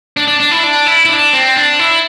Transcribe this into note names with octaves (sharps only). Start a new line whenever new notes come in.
D4
D4
D4
E4
D4
E4
E4
D4
C4
D4
E4